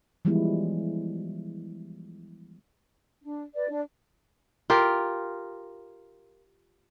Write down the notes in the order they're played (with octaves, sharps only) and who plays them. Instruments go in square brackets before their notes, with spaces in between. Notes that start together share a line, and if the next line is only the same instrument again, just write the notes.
[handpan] E3 F3 G3 G#3 B3 E4
[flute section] D4
B4 D5
D4
[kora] F4 G4 A#4